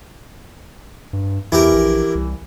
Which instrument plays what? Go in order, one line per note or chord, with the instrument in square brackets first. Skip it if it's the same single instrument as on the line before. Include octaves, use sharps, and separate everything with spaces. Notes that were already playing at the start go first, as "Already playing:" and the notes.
[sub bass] G2
[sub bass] E2 [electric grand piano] E3 [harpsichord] E4 G4 A#4
[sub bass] A#1
C2